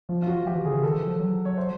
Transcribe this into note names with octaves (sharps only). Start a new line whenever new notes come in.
F3 F4
F4
F#4
F3 G4
E3
D3 G#4
C#3
D#3 A4
E3
F3
F#3
C#5
C5